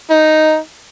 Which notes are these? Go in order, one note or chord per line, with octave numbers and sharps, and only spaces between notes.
D#4